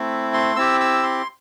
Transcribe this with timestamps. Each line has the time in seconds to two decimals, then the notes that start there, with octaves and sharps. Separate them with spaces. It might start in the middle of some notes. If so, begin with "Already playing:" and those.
Already playing: A3 C4 E4
0.34 C6
0.56 C4 E4 G4 E6
0.80 E6
1.03 C6